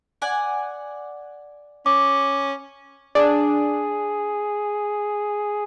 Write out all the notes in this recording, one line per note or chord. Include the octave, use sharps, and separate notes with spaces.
D5 F#5 G#5
C#4 D6
D4 G#4